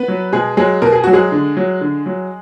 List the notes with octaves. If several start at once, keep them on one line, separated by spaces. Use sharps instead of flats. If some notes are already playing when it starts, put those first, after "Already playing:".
Already playing: B3 B4
F#3
B2 G#3 G#4
F#3 G#3 G#4
B2 A#4
G#4
F#3 F#4
G#3 G#4
D3
F#3
D3
F#3